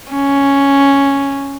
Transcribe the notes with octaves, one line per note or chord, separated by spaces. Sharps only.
C#4